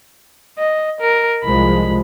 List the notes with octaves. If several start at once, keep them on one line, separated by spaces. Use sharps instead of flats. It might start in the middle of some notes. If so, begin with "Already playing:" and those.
D#5
A#4
C2 F3 G#3 B5